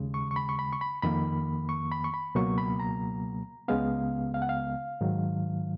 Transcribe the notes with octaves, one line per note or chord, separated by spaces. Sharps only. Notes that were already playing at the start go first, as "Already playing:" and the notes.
Already playing: D#2 C#3 G#3
C#6
C#6
B5
C#6
B5
C#6
B5
F2 D#3 A#3 B5
C#6
B5
C#6
B5
C#2 B2 F#3 A#3 C#6
B5
A#5
C#2 C#3 G#3 B3 F5
F5
F#5
F5
G#2 D#3 F#3